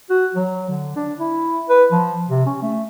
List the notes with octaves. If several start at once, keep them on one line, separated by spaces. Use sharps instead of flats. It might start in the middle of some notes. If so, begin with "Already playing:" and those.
F#4
F#3
D3
D4
E4
B4
F3
C3
C#4
A3